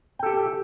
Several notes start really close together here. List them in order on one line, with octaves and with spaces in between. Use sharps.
G5 A4 G4